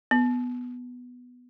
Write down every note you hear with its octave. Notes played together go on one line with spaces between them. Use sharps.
B3